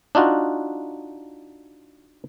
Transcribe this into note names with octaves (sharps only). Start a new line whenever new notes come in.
D4 D#4 F4 F#4